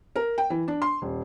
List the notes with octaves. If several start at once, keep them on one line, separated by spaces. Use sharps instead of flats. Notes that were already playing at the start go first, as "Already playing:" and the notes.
A#4
G5
E3
D4
C6
D#1